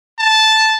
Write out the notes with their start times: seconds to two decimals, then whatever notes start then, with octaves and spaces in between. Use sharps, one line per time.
0.19 A5